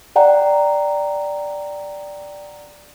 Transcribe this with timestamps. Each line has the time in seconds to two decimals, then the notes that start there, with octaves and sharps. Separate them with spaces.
0.16 D5 F#5 G5 A#5